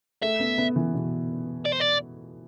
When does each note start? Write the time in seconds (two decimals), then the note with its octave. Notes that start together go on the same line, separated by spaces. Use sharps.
0.22 A3 E5
0.40 B3
0.58 B3
0.76 E3
0.94 B2
1.66 D5
1.73 C5
1.81 D5